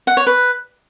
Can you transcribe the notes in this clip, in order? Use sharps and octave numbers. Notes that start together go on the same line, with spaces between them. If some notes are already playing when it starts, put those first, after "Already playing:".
F#5
C#5
B4